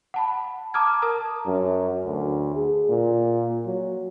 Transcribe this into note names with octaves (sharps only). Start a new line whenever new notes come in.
F#5 A5 B5
A5 A#5 D6 D#6 F6 G#6
A#4 A5 A#5 D#6
F#2
D2
G#4
A#2
F#3